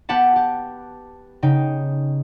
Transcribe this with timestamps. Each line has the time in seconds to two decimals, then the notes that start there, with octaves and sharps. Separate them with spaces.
0.09 B3 G4 F#5 A5
0.36 G4
1.42 C#3 D#4 G5